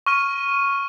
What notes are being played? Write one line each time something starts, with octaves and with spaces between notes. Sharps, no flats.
C#6 F6 D#7